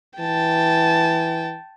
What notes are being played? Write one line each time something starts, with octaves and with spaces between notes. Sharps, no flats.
E3 G5 A5